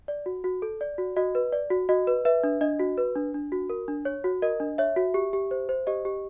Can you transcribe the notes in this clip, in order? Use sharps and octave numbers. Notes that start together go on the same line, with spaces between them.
D5
F#4
F#4
A4
D5
F#4
F#4 D#5
B4
D5
F#4
F#4 D#5
B4
B4 E5
D4
D4 D#5
F#4
B4
D4
D4
F#4
A#4
D4
C#5
F#4
A#4 D#5
D4
C#5 E5
F#4
G4
G4
C5
C5
G4 D#5
G4